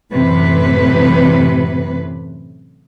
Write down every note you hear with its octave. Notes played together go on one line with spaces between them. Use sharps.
F#2 A2 C3 E3 B4